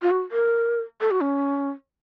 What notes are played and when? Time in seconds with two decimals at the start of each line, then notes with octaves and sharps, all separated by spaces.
0.02 F4
0.11 F#4
0.31 A#4
1.01 A4
1.11 F#4
1.21 C#4